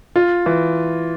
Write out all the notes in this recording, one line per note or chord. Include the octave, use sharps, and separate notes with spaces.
F4
E3